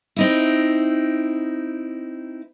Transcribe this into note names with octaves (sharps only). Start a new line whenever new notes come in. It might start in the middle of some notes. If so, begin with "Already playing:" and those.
C4 D#4 E4